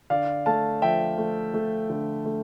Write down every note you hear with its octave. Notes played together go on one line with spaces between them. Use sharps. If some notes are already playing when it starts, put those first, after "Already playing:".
D3 D5 F5
A3 F5 A5
F3 E5 G5
A3
A3
D3
A3